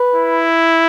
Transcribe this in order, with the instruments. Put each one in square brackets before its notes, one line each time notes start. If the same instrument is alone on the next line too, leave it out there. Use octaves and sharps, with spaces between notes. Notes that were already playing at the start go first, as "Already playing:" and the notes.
Already playing: [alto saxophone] B4
[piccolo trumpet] E4